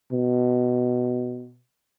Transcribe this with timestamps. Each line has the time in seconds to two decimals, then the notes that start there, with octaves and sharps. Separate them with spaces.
0.12 B2